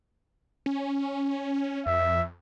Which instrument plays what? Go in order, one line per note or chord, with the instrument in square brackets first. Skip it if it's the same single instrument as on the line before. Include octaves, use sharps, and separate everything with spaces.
[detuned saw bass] C#4
[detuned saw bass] F2 [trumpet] E5